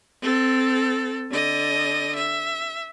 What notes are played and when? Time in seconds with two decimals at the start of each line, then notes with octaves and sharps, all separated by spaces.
0.22 C4 A4
1.31 D3 D#5
2.16 E5